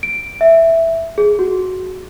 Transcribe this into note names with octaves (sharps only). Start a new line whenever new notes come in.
D7
E5
G#4
F#4